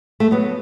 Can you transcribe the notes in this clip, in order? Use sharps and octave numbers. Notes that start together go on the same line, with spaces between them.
A3
F#3 B3